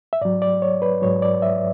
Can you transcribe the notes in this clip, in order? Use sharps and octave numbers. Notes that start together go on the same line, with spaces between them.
E5
G#2 F#3 D5
D5
C#5
B4
G#2 F#3 C#5
D5
E5